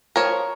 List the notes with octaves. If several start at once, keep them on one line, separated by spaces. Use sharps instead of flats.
F3 A#4 C#5